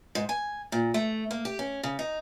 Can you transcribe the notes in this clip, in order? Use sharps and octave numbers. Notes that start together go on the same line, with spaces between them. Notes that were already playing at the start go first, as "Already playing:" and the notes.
G#2
G#5
A#2
A3
A#3
G4
C#4
C#3
D#4